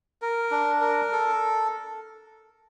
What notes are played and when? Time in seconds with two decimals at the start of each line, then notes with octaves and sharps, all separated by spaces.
0.22 A#4
0.51 D4
0.81 A#4
1.12 A4